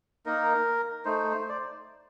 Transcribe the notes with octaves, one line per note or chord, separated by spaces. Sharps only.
A#3 D#4 A#4
A3 D#4 C5
C5
D5